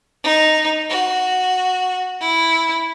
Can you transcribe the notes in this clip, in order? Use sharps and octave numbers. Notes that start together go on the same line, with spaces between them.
D#4
F#4
E4